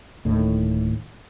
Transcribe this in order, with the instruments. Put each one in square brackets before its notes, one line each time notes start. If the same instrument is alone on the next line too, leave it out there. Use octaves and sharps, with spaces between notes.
[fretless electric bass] D1 A2 D#3 A#3